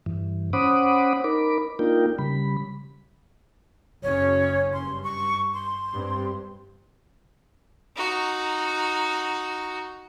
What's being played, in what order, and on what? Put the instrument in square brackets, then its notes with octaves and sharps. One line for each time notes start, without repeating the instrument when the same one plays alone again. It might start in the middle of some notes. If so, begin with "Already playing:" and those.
[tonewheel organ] G2 E3
C#4 C5 F#5 B5 D6 D#6
D#4 A#4 B5 D6
A#3 D4 D#4 F4 A#4 G5
C#3 G3 B5
[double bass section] F#1 F#2 C#4 [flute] C#5
[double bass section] G2 [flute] C6
[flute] C#6
C6
[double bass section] G2 C4
[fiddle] D#4 F#4